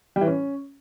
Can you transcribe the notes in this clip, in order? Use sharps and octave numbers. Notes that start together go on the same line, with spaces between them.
G3
E3
C#4